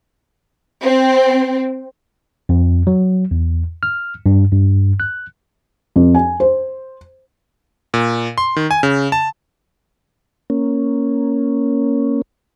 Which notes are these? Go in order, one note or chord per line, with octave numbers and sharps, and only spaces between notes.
C4
F2
F#3
E2
F6
G2
G2
F#6
F2
G#5
C5
A#2
C6
D#3
G#5
C#3
A5
A#3 C#4